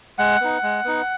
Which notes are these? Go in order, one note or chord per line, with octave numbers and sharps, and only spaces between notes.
G#3 F#5
B3 D#4
G#3
B3 D#4